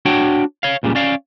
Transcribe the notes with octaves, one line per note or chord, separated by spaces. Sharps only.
D4 F#4 C#5 F#5 G5
C#5 F5
C#2 A#2 C#3 G3
C#4 D5 F5